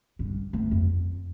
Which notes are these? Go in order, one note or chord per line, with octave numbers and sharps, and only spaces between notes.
G2
A3
F2